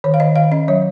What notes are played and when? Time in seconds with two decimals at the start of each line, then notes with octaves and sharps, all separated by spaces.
0.04 D#3 C#5
0.14 F5
0.20 D#3 D#5
0.36 D#3 F5
0.51 C#4 D#5
0.68 F#3 C#5